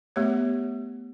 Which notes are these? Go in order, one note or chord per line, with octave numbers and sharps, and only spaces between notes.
A3 B3 G4 C#5